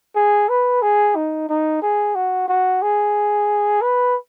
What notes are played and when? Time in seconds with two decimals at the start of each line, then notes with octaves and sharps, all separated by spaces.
0.16 G#4
0.49 B4
0.82 G#4
1.16 D#4
1.49 D#4
1.82 G#4
2.15 F#4
2.48 F#4
2.82 G#4
3.82 B4